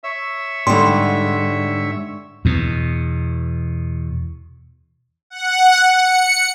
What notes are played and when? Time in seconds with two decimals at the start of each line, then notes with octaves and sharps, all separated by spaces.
0.04 C#5 E5 E6
0.67 G#2 D3 G3 C6
2.45 E2 B2
5.30 F#5
5.94 C#7